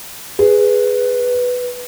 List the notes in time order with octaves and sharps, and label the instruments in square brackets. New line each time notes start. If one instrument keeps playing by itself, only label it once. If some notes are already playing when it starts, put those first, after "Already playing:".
[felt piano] G#4 [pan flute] B4